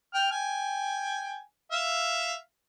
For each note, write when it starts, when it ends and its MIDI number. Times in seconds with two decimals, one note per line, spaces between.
0.15 0.29 79
0.15 0.29 89
0.31 1.40 79
0.31 1.40 80
1.72 2.36 76
1.72 2.36 77